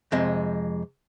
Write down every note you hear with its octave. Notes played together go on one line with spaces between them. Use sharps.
F2 C3 G#3